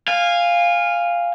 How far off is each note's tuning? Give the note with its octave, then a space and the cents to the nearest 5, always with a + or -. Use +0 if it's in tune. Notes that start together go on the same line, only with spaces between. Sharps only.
F5 +0 G#5 -25